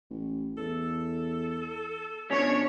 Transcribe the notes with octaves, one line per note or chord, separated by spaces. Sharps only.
A1
E2 A4
B2 F3 C#4 D4 C#5